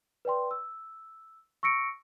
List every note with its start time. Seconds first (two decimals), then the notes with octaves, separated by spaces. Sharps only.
0.25 B4 D5 G5 C6
0.51 E6
1.63 C#6 E6 A#6 C#7 D7